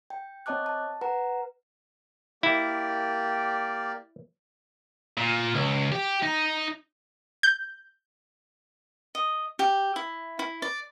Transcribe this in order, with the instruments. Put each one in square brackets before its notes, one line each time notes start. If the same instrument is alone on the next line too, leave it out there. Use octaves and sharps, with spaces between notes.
[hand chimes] G5
C4 C#5 D#5 A5 D6 F#6
A5
B4 F#5 A#5
[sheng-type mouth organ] A#3 G4 D5 [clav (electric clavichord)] E4
[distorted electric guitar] A#2
C#2
G4
D#4
[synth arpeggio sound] G6
[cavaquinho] D#5
G4
E4
E4
D5